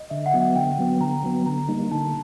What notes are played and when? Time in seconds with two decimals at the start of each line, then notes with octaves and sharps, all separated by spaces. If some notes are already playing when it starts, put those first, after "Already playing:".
Already playing: D#5
0.10 D3 E5
0.26 F#5
0.34 F#3 B3
0.41 F#5
0.55 D3 G5
0.78 F#3 B3
1.00 D3 A#5
1.23 F#3 B3
1.46 D3 A#5
1.69 G3 A#3 D#4
1.91 D3 A5